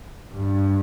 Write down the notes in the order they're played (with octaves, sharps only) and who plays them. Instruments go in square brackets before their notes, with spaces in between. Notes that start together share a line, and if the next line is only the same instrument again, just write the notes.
[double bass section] G2